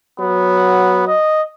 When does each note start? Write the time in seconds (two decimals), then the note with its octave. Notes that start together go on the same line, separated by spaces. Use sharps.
0.20 F#3 B3
1.08 D#5